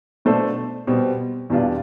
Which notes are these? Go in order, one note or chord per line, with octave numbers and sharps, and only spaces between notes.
B2 A3 D4 A4 C5
B2 G3 C4
E2 B2 G3 D4 F4